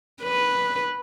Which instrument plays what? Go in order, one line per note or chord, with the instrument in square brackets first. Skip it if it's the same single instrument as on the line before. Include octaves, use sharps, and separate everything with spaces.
[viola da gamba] B4